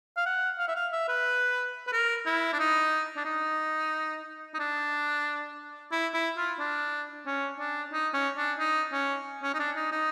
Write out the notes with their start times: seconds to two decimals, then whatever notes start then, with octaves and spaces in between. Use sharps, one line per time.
0.17 F5
0.26 F#5
0.59 F5
0.68 E5
0.76 F5
0.92 E5
1.09 B4
1.87 B4
1.92 A#4
2.26 E4
2.53 D4
2.59 D#4
3.17 D4
3.25 D#4
4.54 D#4
4.59 D4
5.91 E4
6.14 E4
6.37 F4
6.59 D4
7.26 C#4
7.59 D4
7.93 D#4
8.14 C#4
8.37 D4
8.59 D#4
8.93 C#4
9.43 C#4
9.54 D#4
9.59 D4
9.76 D#4
9.92 D#4